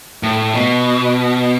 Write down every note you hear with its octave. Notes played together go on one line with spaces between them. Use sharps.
A2
B2